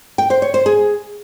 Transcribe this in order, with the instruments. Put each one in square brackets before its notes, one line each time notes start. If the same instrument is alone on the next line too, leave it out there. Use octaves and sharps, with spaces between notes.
[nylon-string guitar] G5
C5
C#5
C5
G#4